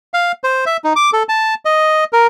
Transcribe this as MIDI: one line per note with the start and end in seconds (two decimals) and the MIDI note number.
0.14 0.32 77
0.44 0.65 72
0.66 0.77 76
0.84 0.93 63
0.96 1.10 86
1.13 1.23 69
1.29 1.54 81
1.65 2.04 75
2.13 2.27 70